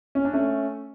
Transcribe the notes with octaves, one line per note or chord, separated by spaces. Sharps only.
C#4
D4
A3 C#4